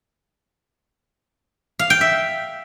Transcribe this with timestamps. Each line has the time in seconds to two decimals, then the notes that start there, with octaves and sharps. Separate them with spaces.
1.79 F5
1.90 G5
2.01 E5